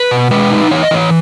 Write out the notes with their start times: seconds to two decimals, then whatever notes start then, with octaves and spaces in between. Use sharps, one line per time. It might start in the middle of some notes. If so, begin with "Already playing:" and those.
Already playing: B4
0.11 B2
0.31 G#3 B4
0.51 D#4
0.71 E3 C#5
0.83 D#5
0.91 E3 C#5